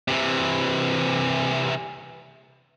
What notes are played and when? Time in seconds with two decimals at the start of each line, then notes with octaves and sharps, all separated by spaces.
0.08 C3 E3